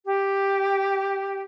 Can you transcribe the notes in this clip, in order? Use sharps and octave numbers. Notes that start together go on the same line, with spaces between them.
G4